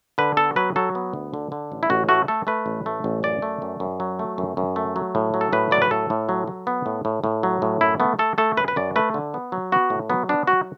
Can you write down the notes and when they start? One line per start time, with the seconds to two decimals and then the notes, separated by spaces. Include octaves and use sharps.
0.18 D3 B4
0.37 B3 A4
0.56 F#3 B4
0.76 F#3 A4
0.95 B3
1.13 D2
1.34 D3
1.52 D3
1.72 A1
1.83 E4
1.90 A1 F#4
2.09 A3 F#4
2.28 A3 A4
2.47 A3 B4
2.66 A1
2.86 A3
3.04 A1
3.23 F#2 D5
3.42 A3
3.62 F#2
3.80 F#2
4.00 F#3
4.19 A3
4.38 F#2
4.57 F#2
4.76 A3
4.96 F#3
5.15 A2
5.34 F#3
5.41 A4
5.53 A2 B4
5.71 F#3 D5
5.82 B4
5.91 A2 A4
6.10 A2
6.29 F#3
6.48 F#3
6.67 B3
6.86 A2
7.05 A2
7.24 A2
7.43 F#3
7.62 A2
7.81 F#2 E4
8.00 A3 B3
8.19 A3 A4
8.38 A3 A4
8.57 F#2 B4
8.68 B4
8.76 F#2 D5
8.96 A3 B4
9.14 D3
9.34 B3
9.52 F#3
9.72 B3 F#4
9.90 A2
10.10 F#3 B3
10.29 B3 D4
10.47 F#3 F#4